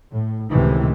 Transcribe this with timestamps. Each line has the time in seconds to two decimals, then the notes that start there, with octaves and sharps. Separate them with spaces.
0.11 A2
0.49 C#2 A2 C3 D#3 E3